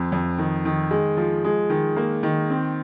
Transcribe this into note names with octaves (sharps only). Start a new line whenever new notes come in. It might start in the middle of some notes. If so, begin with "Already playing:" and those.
Already playing: F2 C4
F2
D#3
D#3
G#3
F3
G#3
D#3
A#3
D#3
C4